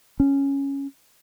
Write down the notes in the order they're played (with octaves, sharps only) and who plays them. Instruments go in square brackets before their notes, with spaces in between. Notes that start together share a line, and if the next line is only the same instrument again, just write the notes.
[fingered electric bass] C#4